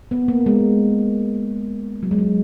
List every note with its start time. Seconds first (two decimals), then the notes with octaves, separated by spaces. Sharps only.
0.11 B3
0.28 A#3
0.46 G#3
2.03 F#3
2.11 G#3
2.18 F#3